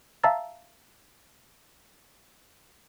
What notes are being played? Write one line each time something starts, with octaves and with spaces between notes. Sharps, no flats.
E5 F5 A5 A#5 E6 A6